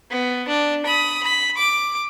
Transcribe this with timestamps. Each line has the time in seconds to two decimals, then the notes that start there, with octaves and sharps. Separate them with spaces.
0.11 B3
0.48 D4
0.86 B5 D#6
1.23 B5
1.57 D6